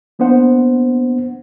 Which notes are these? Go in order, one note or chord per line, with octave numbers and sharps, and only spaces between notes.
A#3 B3 D4 C5 F#5